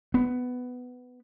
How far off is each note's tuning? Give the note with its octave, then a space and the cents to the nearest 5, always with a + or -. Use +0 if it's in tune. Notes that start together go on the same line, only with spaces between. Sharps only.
B3 +10